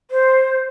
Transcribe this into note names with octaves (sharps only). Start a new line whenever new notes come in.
C5